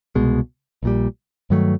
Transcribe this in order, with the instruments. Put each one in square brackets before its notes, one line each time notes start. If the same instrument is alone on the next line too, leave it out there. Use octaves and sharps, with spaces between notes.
[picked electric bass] C2 B2 G#3
A#1 A#2 G3
G2 D#3 F#3 A3